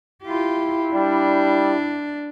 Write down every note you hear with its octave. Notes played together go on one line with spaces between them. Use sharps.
E4 F4 G4
G3 D4